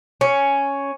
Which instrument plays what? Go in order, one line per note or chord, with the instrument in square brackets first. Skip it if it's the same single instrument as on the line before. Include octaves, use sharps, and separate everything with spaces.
[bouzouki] C#4